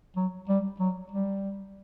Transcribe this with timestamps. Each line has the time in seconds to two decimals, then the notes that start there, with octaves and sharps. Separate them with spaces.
0.16 F#3
0.49 G3
0.80 F#3
1.12 G3